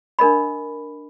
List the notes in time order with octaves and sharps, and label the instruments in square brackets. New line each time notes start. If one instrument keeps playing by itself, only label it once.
[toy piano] D4 A#4 D#5 B5